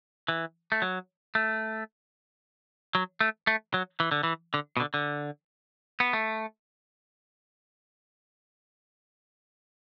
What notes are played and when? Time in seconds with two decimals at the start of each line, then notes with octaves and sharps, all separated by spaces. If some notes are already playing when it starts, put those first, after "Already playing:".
0.28 E3
0.72 A3
0.82 F#3
1.35 A3
2.95 F#3
3.21 A3
3.47 A3
3.74 F#3
4.00 E3
4.11 D3
4.23 E3
4.54 D3
4.77 B2
4.80 D3
4.94 D3
6.00 B3
6.13 A3